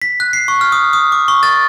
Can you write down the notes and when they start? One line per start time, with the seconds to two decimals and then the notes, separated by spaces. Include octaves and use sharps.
0.02 B6
0.20 F#6
0.33 C7
0.48 C#6
0.61 F6
0.72 D#6
0.93 D#6
1.12 D6
1.28 C#6
1.43 A6